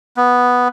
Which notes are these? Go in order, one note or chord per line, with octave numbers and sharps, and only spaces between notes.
B3